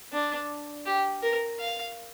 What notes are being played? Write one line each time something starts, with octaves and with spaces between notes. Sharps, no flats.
D4
G4
A#4
F5